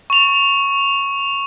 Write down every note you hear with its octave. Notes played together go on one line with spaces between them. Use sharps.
C#6 F7